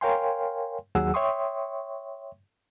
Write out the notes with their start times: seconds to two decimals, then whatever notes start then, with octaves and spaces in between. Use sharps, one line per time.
0.01 A#4 C#5 F5 G5 G#5 C6
0.95 D#2 F#3 G#4 F#5 E6
1.14 C#5 E5 G5 C6 C#6 D#6